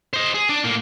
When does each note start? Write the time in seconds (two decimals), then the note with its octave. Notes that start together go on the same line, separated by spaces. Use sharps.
0.13 C5 D#5
0.35 G#4
0.49 D4 D5
0.64 A2 A#3